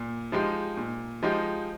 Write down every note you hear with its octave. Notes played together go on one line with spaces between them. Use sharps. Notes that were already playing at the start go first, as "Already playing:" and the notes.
Already playing: A#2
F3 G#3 D#4 G4
A#2
F3 G#3 D#4 G4